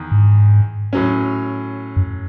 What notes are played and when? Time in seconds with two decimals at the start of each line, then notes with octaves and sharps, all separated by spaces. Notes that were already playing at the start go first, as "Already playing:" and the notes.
Already playing: E2 D#3
0.12 G#2
0.93 A2 F#3 C#4
1.97 F#2